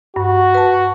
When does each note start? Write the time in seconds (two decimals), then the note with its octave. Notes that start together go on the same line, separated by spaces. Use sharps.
0.16 G2 F#4
0.54 B4 A5